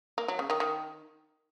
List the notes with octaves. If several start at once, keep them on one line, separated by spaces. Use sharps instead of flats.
A#3
F#3
C#3
D#3
D#3